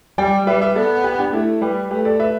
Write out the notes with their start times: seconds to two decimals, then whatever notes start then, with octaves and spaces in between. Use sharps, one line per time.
0.18 G3 D5 G5
0.46 G3 B4 E5
0.61 B4 E5
0.75 B3 A4 D5
1.04 G4 B4
1.19 D4 G4
1.33 A3 E4 A4
1.62 G3 G4 B4
1.91 A3 G4 B4
2.05 A4 D5
2.19 B4 E5